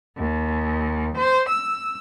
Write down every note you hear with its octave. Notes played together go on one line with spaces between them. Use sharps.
D#2
C5
E6